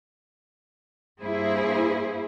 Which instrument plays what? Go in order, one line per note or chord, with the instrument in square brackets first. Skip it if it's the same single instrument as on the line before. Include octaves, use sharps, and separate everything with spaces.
[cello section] G2 A#3 E4 G#4 C5